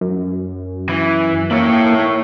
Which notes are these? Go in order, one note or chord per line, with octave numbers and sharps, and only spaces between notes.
F#2
E3
A#3 E4 C#5